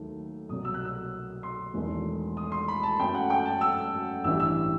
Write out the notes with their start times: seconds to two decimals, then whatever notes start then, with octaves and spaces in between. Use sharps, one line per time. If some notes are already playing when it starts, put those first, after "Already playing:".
Already playing: D#2 D#3 F#3 A3
0.49 C2 B2 F#3 D#6
0.65 E6
0.74 F#6
0.85 E6
1.43 C6
1.74 E1 E2 D#3 A3
2.37 D#6
2.52 C6
2.68 B5
2.83 A5
2.99 F#2 F#3 A3 G5
3.14 F#5
3.30 G5
3.45 A5
3.61 E6
4.24 A1 G2 E3 G3 E6
4.40 E6